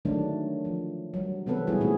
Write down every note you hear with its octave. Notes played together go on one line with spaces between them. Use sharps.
D3 D#3 F#3 G#3 A3 D4
F3
F#3 G3
C3 E3 B3 C4 A4 B4
G3 G#3 B3 E4 F#4 G#4
A#2 D#3 A3 C4 D#4 G#4